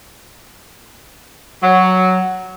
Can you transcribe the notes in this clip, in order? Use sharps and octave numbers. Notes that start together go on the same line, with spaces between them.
F#3